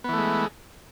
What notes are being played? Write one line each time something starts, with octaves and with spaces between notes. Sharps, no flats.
E3 G#3 A3 B3